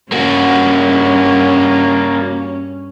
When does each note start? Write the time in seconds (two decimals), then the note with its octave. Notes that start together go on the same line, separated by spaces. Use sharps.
0.12 G2 A#3 C#4 F#4